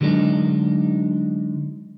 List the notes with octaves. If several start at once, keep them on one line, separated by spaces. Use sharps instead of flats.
D3 F#3 G#3 D4 D#4